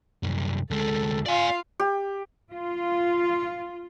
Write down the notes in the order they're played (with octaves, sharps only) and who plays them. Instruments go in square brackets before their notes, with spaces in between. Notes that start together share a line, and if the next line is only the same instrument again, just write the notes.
[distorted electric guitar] C2 F#2
[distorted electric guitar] D2 G#3 [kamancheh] A4
[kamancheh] F4 F5 [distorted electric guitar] D5 G#5
[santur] G4
[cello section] F4